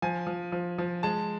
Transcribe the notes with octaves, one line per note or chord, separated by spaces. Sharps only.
F3 G#5
F3
F3
F3
G#3 A5